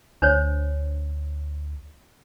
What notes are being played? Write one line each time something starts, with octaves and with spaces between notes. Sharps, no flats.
D2 D4 C5 C#5